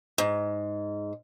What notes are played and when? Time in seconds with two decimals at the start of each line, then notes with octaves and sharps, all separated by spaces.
0.18 G#2